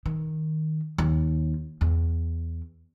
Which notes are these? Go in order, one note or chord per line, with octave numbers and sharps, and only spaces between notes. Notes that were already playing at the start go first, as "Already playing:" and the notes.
D#3
D#2
E2